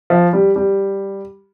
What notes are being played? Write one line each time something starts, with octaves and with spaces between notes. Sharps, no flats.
F3
G3
G3